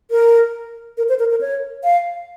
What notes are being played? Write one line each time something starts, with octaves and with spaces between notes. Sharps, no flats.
A#4
A#4
C5
A#4
A#4
C#5
F5